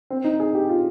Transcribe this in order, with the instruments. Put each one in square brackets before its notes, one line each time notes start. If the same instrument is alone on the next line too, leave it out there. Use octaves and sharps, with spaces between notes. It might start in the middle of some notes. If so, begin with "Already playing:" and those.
[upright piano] C4
D#4
G#4
G4
F4